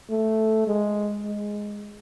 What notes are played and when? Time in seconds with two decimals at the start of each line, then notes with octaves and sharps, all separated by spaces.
0.10 A3
0.67 G#3
1.25 G#3